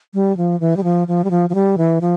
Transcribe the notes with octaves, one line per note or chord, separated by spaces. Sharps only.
G3
F3
E3
G3
F3
F3
G3
F3
F3
G3
E3
F3